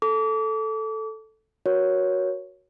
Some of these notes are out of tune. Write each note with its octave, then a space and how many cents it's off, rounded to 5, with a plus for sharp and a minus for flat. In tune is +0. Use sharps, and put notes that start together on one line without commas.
A4 +0 D6 -35
F#4 +0 A#4 +25 C#5 +0